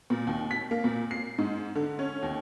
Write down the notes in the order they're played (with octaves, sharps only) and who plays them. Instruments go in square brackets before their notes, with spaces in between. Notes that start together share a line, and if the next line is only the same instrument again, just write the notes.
[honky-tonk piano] A#2
D#2
B6
A#3
A#2
C7
G#2
D3
C#4
D#2